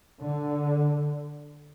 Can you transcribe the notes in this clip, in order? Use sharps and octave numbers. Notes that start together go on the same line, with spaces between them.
D3